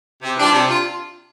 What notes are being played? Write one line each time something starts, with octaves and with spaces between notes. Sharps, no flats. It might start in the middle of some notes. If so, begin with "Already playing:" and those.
C3
E3 G3 D4 F4
C3
D4 F4